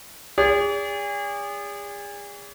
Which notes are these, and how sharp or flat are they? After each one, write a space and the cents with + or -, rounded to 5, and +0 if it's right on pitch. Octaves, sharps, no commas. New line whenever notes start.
G#4 -35 D5 -45